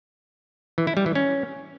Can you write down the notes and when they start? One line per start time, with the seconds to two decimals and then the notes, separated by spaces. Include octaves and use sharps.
0.78 E3
0.87 E4
0.97 G3
1.06 E3
1.15 C#4